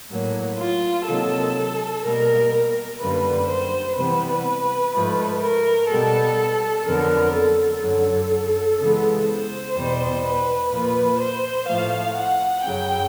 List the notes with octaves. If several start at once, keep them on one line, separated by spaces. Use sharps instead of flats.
A2 F#3 A#3
F4
C3 D#3 F#3 A#3 A4
B2 G3 A#3 A#4
A#4
F#2 D3 G3 A#3 B4
C5
C3 E3 G3 B3 B4
G#2 F3 A3
A#4
B2 G3 B3 A4
F2 D3 F#3 B3 A#4
A4
F#2 D3 F#3 A4
C#3 E3 G#3 B3
C5
E2 B2 G3
B4
A#2 F3 A#3 B4
C5
A2 F3 A3 F5
F#5
F#2 C#3 F#3 G5